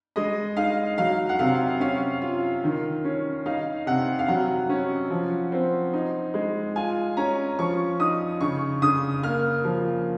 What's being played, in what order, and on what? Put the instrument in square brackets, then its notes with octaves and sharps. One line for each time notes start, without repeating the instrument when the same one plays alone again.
[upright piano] G#3 D#5
D#4 F5
F#3 F5
F#5
C3 F5
C#4 F5
F4
D#3
C#4
D#4 F5
C3 F#5
F5
F#3 F#5
C#4
F3
C4
D#4
G#3
F4 G#5
C#4 A#5
F3 C#6
D#4 D#6
C#3 C#6
C#3 D#6
A#3 F6
F3